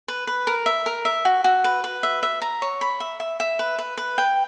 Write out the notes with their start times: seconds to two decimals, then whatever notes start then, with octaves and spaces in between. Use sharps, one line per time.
0.08 B4
0.27 B4
0.47 A#4
0.66 E5
0.86 A#4
1.05 E5
1.25 F#4
1.44 F#4
1.64 B4
1.84 B4
2.03 E5
2.23 E5
2.42 A#5
2.62 C#5
2.81 B5
3.00 E5
3.20 E5
3.40 E5
3.59 B4
3.79 B4
3.97 B4
4.18 G5